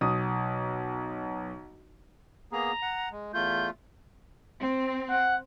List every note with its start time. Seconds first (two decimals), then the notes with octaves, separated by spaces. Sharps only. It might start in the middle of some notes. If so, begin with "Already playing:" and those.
0.01 B1 D#6
2.52 A#3 B3 G#4 A#5
2.82 F#5
3.11 G#3
3.33 E2 A3 F4 G6
4.61 C4
5.10 F#5